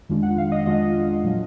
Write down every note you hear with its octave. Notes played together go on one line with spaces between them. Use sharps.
F2 D#3 G#3 D4 F4
F#5
F5
D#5
F2 D#3 G#3 D4 F4 D#5
A#2 F#3 D4